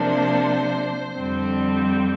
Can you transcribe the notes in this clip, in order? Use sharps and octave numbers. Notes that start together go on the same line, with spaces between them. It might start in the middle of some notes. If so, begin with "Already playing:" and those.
Already playing: C3 F3 A#3 D4 C5
F2 D3 G3 C4